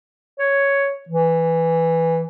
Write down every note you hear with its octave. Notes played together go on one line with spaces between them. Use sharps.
C#5
E3